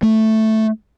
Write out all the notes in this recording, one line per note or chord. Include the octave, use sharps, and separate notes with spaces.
A3